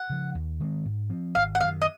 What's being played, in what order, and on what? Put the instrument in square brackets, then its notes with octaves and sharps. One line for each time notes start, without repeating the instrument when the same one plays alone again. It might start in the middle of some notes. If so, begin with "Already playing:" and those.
Already playing: [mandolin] F#5
[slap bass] C#3 F3
D#2
D#3 G#3 C4
G#2
F3 C4
[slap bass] G#1 [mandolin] F5
[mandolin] F#5
[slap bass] F#2 D#3 [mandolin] F5
[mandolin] D#5